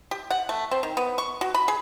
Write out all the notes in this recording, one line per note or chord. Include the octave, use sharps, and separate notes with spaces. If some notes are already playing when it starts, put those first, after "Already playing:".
G4
F#5
A3
C4
D#3
B3
C#6
F#4
B5
G#4